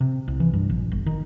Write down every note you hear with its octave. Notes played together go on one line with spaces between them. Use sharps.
C3
C2
E3
G2
A#1
G1
D#3